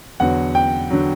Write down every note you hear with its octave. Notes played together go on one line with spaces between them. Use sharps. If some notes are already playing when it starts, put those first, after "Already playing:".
E2 D3 F#3 F#5
G5
D3 F#3